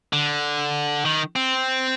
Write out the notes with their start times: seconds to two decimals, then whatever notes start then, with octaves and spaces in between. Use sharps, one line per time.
0.13 D3
1.05 D#3
1.36 C4